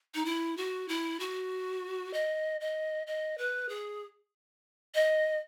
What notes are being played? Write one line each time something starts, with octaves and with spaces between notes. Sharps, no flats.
D#4
E4
F#4
E4
F#4
D#5
D#5
D#5
B4
G#4
D#5